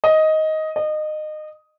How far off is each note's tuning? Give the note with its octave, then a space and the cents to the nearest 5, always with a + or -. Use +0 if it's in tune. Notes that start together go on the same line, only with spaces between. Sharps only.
D#5 +10
D#5 -25